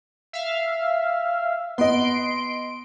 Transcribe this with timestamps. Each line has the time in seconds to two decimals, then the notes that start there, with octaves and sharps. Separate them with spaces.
0.33 E5 F5
1.78 B3 D#5 C6 D7